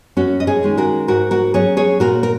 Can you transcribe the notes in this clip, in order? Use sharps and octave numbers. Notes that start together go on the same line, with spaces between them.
F#2 C#4 F#4
D#5
G#4 C#5
D#3 G#3 C#4
F#4 A#4
G#2 F#4 A#4
F#4 A#4
F#3 C#4 G#4 C#5
G#4 C#5
A#2 F#4 A#4
A#4